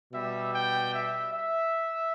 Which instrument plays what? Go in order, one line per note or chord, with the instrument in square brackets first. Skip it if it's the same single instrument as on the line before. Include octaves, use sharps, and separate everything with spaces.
[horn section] B2 G3 E5
G5
E5
E5